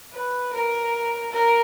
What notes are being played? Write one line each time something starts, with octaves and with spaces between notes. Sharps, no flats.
B4
A#4
A#4